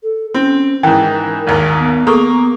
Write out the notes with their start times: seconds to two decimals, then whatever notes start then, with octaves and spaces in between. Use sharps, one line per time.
0.03 A4
0.34 C4 C#4
0.83 G#2 E3 A#4 G5
1.47 G#1 D#2 A#4
1.79 B3
2.07 A#3 B3 G#4 A4 C#6